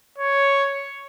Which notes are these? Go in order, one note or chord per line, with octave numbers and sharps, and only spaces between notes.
C#5